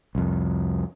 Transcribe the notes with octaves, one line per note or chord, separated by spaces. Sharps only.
C2 F2